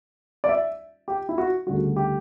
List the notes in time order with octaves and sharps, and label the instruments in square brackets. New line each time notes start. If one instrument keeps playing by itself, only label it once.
[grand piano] D5
E5
G4
E4
F#4
D2 C#3 G3 F#4
G4